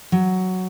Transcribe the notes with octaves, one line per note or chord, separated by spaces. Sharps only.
F#3